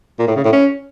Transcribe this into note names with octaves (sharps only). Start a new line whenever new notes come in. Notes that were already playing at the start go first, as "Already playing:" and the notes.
A#2
A2
C#3
A2
C#4